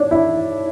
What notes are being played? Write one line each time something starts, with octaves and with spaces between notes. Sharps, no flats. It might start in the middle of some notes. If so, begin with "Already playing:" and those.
Already playing: D4 C#5
E4